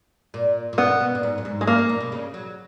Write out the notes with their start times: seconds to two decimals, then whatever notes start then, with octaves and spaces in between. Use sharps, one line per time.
0.34 A#2
0.73 A#2
0.78 B2 B3
1.00 B2
1.15 A#2
1.23 G#2
1.38 F#2
1.45 G#2
1.61 G#3
1.67 F#2 A#3
1.78 G#2
1.89 A#2
2.00 B2
2.12 C#3
2.34 F#3